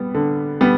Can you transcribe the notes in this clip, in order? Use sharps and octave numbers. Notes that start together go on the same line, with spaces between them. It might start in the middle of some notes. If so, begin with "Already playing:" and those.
Already playing: G3 B3
D3
G3 B3